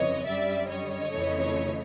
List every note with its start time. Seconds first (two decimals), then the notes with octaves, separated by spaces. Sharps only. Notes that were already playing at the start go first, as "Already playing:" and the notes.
Already playing: G1 F2 C#3 E3 C#5 D#5
0.26 F#2 D3 G3 D5 E5
0.69 C#5 D#5
1.10 F2 C#3 E3 A3